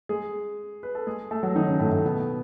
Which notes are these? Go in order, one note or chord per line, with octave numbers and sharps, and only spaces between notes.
G#3 G#4
B4
A4
G#3 G#4
A3 A4
F#3 F#4
D#3 D#4
C#3 C#4
A2 A3
A2 A3
B2 B3